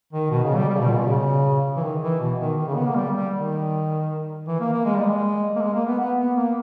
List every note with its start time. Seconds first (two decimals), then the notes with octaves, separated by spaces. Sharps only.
0.13 D#3
0.31 B2
0.44 C#3
0.56 G3
0.70 G3
0.74 C#3
0.79 B2
0.88 A#2
0.98 B2
1.07 C#3
1.77 E3
1.82 D#3
2.02 E3
2.20 B2
2.40 D#3
2.59 D#3
2.67 C#3
2.77 B3
2.87 A#3
2.96 G3
3.15 G3
3.34 D#3
4.48 E3
4.60 A#3
4.72 A#3
4.85 G#3
4.96 G3
5.05 G#3
5.56 A#3
5.61 G#3
5.74 A#3
5.87 B3
5.99 B3
6.18 B3
6.37 A#3